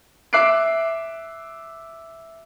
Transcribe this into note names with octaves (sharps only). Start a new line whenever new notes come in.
E5 D6 F#6 C7 D7